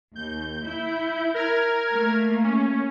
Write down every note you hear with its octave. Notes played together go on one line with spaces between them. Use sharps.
D#2 G6
E4
A#4 F6 G#6
A3 A#3
C#4